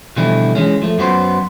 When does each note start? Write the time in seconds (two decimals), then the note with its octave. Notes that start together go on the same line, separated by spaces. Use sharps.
0.16 B2 D3 E3 F3 G3 E4
0.55 E3 G#3 C#4
0.82 F3 A3
0.98 F#2 F#3 B3 C5 C6